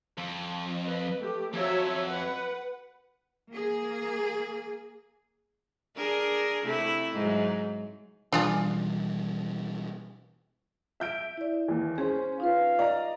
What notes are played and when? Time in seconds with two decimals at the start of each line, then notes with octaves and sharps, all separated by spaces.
0.18 F2
0.85 B4
1.18 A3 G4
1.54 F2 F#3 C#5 E5
2.05 B4 F#5
3.51 A#3 G#4
5.96 D4 G#4 A#4
6.64 C3 A3 E4
7.13 G#2 F#3
8.33 B2 E3 G3 D4 F4 G#4
11.00 E5 G6 D7
11.37 E4 D5
11.68 D#2 E3
11.98 C#4 G#4 C5
12.40 D#4 F4 B4 F5
12.79 D5 D#5 A#5